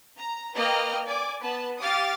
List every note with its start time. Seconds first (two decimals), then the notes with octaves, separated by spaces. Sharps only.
0.18 A#5
0.54 A#3 B4 D#5 G5 A#5 F6
1.05 D5 G#5 D6
1.41 B3 B4 A5
1.80 G4 F5 D6 D#6 F6 A6